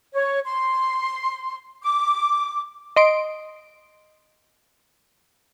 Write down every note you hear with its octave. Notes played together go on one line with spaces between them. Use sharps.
C#5
C6
D6
D#5 C6 D7